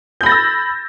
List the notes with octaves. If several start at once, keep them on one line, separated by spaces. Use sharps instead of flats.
B5 E6 G6 A6 A#6